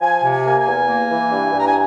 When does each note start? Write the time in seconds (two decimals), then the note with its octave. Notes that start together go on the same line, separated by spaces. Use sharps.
0.01 F3 G#5
0.23 C3
0.31 G#5
0.45 A#3
0.59 G#5
0.67 E2
0.88 A#3
1.10 E3
1.32 G2
1.53 G2
1.58 A#5
1.66 G#5